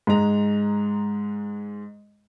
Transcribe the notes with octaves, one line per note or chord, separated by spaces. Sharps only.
G#2 G#3 A#5